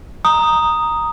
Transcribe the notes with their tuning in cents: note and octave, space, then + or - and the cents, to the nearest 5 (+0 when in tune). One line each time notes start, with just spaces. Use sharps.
A#5 +0 D#6 +0